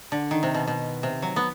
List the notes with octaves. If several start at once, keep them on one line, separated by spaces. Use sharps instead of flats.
D3
D#3
C3
B2
B2
C3
F#3
B3